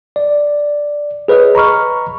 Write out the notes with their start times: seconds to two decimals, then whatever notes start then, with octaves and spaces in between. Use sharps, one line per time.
0.16 D5
1.28 G#4 B4 C#5 D#5
1.55 A#5 B5 C#6 F6